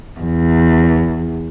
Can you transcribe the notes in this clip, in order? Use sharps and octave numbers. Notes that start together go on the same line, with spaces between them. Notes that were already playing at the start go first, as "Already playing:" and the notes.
E2